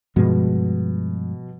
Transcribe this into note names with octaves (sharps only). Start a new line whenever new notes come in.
G2 B2 F3 G#3